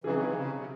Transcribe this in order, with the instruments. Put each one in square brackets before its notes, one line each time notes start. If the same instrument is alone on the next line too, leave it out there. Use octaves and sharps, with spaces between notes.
[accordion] C#3 E3 [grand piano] F#3 C4 D#4 G#4
[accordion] C#3
C3
C#3
C3